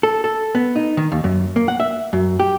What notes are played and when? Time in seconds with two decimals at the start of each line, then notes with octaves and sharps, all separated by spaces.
0.03 A4
0.24 A4
0.55 B3
0.76 D#4
0.97 D#3
1.12 D#2
1.24 F#2
1.56 A#3
1.68 F#5
1.80 E5
2.13 F#2
2.40 G4